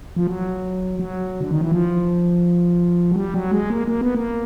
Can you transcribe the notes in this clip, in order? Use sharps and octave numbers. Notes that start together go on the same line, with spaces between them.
F3
F#3
F#3
D3
D#3
E3
F3
F#3
G3
F#3
G#3
A#3
A#3
B3
A#3